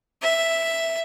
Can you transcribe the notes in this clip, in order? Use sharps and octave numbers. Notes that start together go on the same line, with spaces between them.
E5